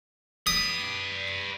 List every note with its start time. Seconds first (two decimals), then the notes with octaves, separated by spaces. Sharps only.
0.47 B4 D5 D#6